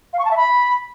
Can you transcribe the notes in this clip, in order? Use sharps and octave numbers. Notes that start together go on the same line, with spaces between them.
F5
C#6
A5
E5
B5